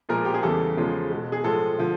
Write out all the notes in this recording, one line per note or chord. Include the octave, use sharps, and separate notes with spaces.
A#2 F3 G#3 A#4
G4
G#4
E2 C#3 E3 G3 A4
E2 C#3 F3 G#3
B2 G#3
G#4
A2 F3 G#3 A4
D3 F3